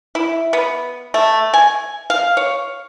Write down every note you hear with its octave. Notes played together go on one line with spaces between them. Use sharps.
E4
B3
A3
G#5
F5
C#5